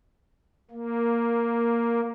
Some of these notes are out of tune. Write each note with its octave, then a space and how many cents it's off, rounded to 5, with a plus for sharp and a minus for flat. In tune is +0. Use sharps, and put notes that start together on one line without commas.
A#3 +0